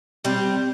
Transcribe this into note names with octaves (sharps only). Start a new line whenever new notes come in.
G3 C4